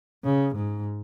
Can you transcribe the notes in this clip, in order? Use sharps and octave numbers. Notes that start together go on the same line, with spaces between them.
C#3
G#2